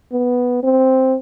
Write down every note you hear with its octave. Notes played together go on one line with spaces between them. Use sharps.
B3
C4